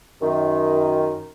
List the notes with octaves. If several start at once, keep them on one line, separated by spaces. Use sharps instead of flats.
F#2 D#3